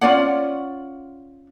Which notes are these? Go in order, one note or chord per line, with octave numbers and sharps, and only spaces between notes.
C#4 F4 D5 F#5